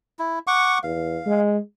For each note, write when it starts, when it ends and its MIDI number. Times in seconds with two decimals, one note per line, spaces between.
0.19 0.39 64
0.47 0.78 78
0.47 0.78 85
0.47 0.78 86
0.83 1.18 40
0.83 1.40 77
1.26 1.58 56